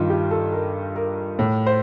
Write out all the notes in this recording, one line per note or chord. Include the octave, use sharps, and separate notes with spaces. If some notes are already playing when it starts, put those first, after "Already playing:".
Already playing: G2 D#3 D#4 F4
G4
A4
A#4
A#4
A2
C5